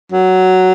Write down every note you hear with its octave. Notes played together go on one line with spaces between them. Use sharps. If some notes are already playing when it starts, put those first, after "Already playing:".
F#3